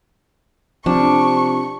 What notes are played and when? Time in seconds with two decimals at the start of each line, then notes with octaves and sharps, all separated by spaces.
0.86 C3 F3 C4 D4 C#6